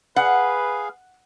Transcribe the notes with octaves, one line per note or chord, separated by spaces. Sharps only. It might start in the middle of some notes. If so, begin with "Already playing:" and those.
G#4 B4 F5 F#5